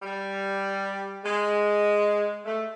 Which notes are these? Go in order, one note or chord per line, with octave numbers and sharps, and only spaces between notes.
G3
G#3
A3